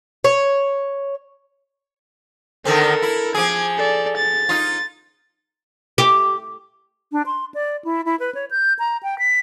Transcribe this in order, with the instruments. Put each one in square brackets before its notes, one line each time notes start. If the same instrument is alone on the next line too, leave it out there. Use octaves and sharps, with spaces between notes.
[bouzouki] C#5
[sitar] D3 D#3 C4 [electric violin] A4 A#4
[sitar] E4
[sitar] F3 G#4 [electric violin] D6 G#6
[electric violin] A4 D5
A6
[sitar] D#4 F4
[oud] G4
[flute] D4
C6
D5
E4
E4
B4
C#5
G6
A#5
G5
B6